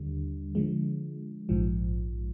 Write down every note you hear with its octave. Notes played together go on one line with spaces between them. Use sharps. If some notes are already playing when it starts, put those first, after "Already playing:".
Already playing: D#2 D3 G3
D3 F3 G#3
A#1 G#2 F3